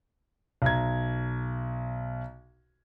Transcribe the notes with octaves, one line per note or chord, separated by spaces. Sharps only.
B1 A#5 G#6